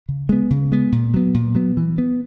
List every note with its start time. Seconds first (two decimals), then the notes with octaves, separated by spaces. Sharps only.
0.09 C#3
0.29 G#3 B3
0.50 C#3
0.72 G#3 B3
0.92 A#2
1.14 F#3 B3
1.34 A#2
1.55 F#3 B3
1.77 E3
1.98 B3